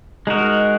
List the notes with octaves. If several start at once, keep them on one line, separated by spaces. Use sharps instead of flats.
G#3 D#4 F#4 A#4